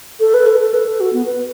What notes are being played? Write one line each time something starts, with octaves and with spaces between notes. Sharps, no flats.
A4
B4
A4
A4
B4
A4
F#4
B3
B4